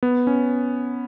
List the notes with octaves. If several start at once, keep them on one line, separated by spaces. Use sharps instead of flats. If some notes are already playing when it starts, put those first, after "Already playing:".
B3
C#4